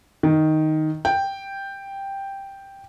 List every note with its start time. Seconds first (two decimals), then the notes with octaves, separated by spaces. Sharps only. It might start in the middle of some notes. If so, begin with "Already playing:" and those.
0.23 D#3
1.05 G5